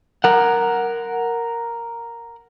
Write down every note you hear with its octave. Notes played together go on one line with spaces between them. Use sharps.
A#4 F#5